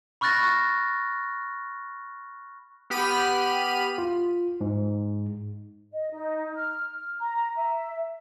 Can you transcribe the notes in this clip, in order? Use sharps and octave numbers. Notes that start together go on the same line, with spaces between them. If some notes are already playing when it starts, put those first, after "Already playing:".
B5 C#6 F6 F#6 A6 A#6
B3 G4 B5 F6 D#7
F4
G#2
D#5
D#4
F6
F6
A#5
E5